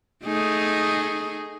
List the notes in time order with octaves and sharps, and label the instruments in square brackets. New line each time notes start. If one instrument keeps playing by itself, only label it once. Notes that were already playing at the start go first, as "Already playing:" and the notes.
[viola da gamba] A3 D#4 G#4